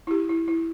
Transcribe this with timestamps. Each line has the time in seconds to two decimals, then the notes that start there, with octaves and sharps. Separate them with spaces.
0.07 E4
0.11 G4
0.29 E4
0.48 E4